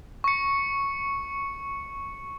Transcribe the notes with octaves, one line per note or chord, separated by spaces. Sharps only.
C#6 C#7